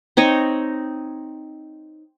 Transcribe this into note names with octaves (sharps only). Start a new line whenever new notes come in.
C4 D#4 C#5 D#5